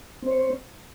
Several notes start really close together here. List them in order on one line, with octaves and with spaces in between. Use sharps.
C4 C5 C#5